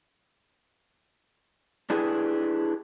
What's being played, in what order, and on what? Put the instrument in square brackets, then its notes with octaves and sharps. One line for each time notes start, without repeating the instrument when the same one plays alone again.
[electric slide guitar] D4 E4 G4 G#4 B4